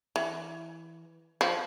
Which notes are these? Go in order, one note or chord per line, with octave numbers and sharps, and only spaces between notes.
E3
F3